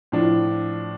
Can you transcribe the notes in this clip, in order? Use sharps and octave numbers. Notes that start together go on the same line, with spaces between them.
A2 F3 D4